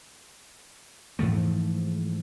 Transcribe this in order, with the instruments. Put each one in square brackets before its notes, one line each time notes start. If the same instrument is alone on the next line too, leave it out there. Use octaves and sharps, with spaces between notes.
[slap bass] G#2 E3 F3 A3